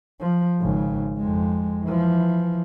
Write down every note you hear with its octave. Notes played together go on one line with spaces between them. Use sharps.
F3
G#1 C#3
F2 G#3
E3 F3